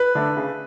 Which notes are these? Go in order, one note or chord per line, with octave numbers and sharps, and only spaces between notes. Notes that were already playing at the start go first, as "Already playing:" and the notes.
Already playing: B4
D3 A3 D4
C#3